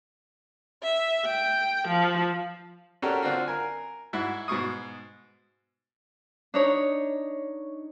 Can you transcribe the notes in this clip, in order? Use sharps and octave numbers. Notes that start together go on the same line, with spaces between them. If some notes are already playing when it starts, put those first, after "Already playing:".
E5
G5
F3
C#4 D4 F#4 G4 A4 A#4
D3 C4 D4 F4 F#4
A#4 G#5
G#2 E4 F#4
G#2 B2 C#6 D#6
D4 D#4 C#5